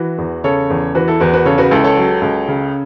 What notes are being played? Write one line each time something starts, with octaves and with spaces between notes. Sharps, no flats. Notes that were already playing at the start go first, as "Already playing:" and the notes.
Already playing: E3 F#4 B4
E2
C#3 A4 C#5
E2
E3 F#4 B4
E4 A4
E2 F#4 B4
F#4 B4
C#3 A4 C#5
F#4 B4
C#2 E4 A4
A4 C#5
F#3
C#2
C#3